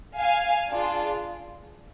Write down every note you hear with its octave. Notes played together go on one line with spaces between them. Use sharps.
F5 G#5
D4 F4 G#4